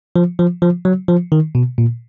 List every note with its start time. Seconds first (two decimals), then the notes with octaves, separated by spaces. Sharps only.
0.16 F3
0.39 F3
0.62 F3
0.85 F#3
1.09 F3
1.32 D#3
1.55 B2
1.78 A#2